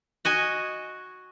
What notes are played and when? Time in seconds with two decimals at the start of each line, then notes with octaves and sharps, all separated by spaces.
0.25 F#4 D#5 G#5